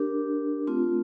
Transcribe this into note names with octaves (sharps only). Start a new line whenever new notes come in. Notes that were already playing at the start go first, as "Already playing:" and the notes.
Already playing: D4 G4 A#4
A3 C4 F4